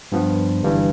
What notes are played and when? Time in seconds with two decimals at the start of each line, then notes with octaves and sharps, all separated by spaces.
0.12 G2 F3 B3
0.62 G1 G2 E3